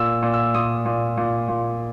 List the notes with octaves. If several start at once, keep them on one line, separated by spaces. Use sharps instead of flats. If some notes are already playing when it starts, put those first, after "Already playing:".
Already playing: A#2 E6
A#2
E6
A#2 D#6
A#2
A#2
A#2